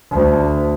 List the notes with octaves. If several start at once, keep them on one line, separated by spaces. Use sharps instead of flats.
D2